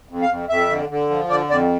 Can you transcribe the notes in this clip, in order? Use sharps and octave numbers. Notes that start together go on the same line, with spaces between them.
F2
F5
F2
F2 E5
D3
D3
F3
D3 D5
F2 D5